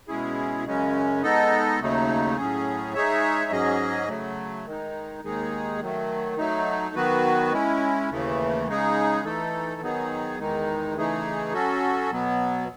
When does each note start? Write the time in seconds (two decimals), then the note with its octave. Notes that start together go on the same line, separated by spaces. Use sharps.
0.08 B2 G#3 C#4 E4 G#4
0.66 F#2 C#3 G#3 C#4
1.23 G#3 B3 D#4 A4 D#5
1.80 D#2 C#3 F#3 A3 D#4
2.36 A2 F#3 C#4 G#4
2.94 G#3 D#4 G#4 C#5 E5
3.51 G#2 F#3 C#4 G#4 D#5
4.09 C#3 F#3 A3
4.66 D#3 G#3 D#4
5.23 D#2 D#3 G#3 D#4 G#4
5.81 D#3 F#3 A3
6.38 F#3 A3 D#4
6.95 D#3 F#3 B3 F#4 B4
7.52 G#3 C#4 E4
8.10 D#2 C#3 E3 A3
8.67 C#3 G#3 D#4 G#4
9.24 E3 A3 D#4 A4
9.81 D#3 F#3 B3 D#4 G#4
10.39 E2 D#3 G#3 D#4
10.96 C#3 E3 A3 D#4 G#4
11.53 F#3 C#4 F#4 A4
12.11 B2 F#3 B3